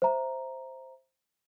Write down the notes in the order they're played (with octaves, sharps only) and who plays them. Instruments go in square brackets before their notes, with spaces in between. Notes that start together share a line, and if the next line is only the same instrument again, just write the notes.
[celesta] C5 E5 A#5